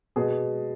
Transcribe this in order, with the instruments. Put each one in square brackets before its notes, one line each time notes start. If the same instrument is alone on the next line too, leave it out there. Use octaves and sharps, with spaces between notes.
[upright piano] B2 G#4